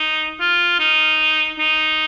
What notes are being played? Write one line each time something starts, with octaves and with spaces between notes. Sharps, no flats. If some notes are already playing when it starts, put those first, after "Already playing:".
Already playing: D#4
F4
D#4
D#4